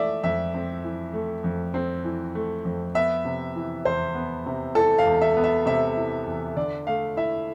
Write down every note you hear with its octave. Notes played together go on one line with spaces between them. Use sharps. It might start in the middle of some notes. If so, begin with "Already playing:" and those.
Already playing: E3 A3 D5 E5
F2 E5
C4
E3
A3
F2
C4
E3
A3
F2
B3 E5
C3
E3
E2 C5
B3
C3
E3 A4
F5
E2
E5
B3
E5
C3 E5
E3
E2
D3 D5
A3 F5
E4 E5